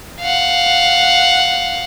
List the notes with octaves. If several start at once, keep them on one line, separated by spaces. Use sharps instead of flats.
F5 F#5